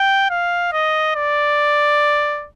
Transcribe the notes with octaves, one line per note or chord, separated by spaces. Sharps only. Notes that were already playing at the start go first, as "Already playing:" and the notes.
Already playing: G5
F5
D#5
D5